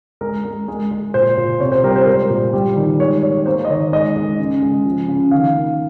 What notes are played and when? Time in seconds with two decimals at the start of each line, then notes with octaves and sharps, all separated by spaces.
0.21 G#3 A#4
0.45 G#3
0.68 G#3
0.91 G#3
1.14 A#2 C5
1.37 A#2
1.60 C3 C#5
1.72 C5
1.84 G3 A#4
1.96 C5
2.02 A#4
2.07 G#3 C5
2.30 A#2
2.53 G3
2.76 D#3
3.00 G#3 C#5
3.23 G#3 C#5
3.46 A#3 C5
3.65 D#5
3.69 D#3 C#5
3.92 G#3 D#5
4.16 G#3
4.39 C#3
4.62 G#3
4.85 F3
5.08 C#3
5.31 D#3 F5
5.55 A#3